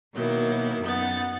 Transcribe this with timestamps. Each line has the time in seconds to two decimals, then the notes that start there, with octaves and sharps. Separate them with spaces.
0.14 B2 D#3 F#3 A#3 E4
0.83 F#2 B3 D#4 F#5 A6